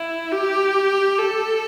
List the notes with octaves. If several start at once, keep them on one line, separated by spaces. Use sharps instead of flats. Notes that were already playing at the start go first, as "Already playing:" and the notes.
Already playing: E4
G4
A4